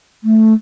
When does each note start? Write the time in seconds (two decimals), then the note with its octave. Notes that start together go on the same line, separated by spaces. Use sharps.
0.24 A3